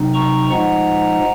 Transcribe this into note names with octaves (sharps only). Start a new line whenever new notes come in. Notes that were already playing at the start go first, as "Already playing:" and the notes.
Already playing: C3 F#3 C4 D#4
A#5 C#6
A#2 F3 G#3 D#4 F#5 A#5